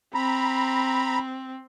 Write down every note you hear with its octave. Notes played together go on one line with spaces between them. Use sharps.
C4 A#5 B5